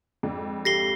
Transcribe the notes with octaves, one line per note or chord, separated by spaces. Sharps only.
F2 G#2 D4
G4 A4 F5 A#6 C7 G7